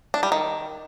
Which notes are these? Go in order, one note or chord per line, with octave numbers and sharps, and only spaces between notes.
D4
G3
D#3